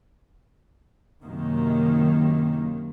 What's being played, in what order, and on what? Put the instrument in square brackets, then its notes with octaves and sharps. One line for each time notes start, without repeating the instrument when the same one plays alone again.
[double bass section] F#2 C3 D#3 A#3